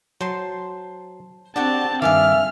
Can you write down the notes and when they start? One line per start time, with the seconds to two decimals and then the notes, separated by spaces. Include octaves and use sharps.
0.21 F#3 C5 A5 C6
1.56 C4 D4 F#4 G4 F#5 A5
2.02 G2 D#3 E5 F5 G#5 D6 F6